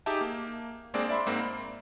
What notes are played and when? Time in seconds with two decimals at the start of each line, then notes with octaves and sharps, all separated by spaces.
0.06 D#4 G4 G#4 E5 G5 A5
0.21 A#3
0.94 G#3 A#3 C4 D4 G#4 D5
1.09 D5 E5 B5 C6
1.26 G#2 A#3 C4
1.40 B5